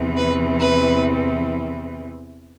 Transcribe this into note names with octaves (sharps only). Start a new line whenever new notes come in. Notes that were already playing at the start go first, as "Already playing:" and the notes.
Already playing: E2 C3 E3
B4
B4